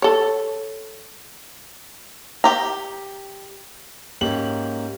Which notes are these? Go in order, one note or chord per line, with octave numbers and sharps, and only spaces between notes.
A4 C#5
G4 A#5
G#2 A#3 C#4 G4 F#7